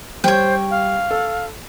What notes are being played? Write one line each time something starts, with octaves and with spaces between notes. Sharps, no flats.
G3 C5 C#5 G5
F5
A4